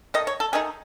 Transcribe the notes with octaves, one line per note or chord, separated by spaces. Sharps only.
D#3 A3 D#4 D#5
C#5
A4
D#3 A3 D#4 G#4